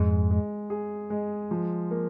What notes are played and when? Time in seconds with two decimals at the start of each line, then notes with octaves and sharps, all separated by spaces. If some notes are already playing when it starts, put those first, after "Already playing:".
Already playing: F2 G#2 G#3
0.31 G#3
0.70 G#4
1.10 G#3
1.51 F3
1.91 A#3